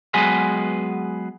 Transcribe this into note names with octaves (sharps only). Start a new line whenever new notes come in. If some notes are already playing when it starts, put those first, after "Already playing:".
F#3 G#3 B3 G#4 B4